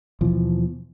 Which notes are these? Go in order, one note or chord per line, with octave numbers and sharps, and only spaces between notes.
D#2 B2 E3 F3